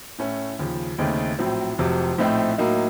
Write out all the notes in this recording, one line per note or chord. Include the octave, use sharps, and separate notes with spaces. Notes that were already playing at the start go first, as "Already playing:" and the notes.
A2 A3 C#4
D#2 C#3 F3
D#2 C#3 A3 C4 D#4
A#1 A2 F#3 C4
F1 F2 C3 F#3
A#1 A2 A3 C4 D#4
A2 F#3 A#3 D#4